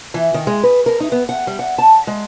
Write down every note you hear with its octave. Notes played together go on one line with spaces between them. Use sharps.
E3
D#3
G#3
B4
A#4
D#4
B3
F#5
G3
F#5
A5
G#3